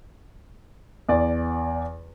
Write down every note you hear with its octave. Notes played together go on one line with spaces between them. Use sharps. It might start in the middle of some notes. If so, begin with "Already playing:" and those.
E2 D5